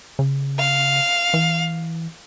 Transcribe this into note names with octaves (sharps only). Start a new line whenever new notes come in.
C#3
F5
E3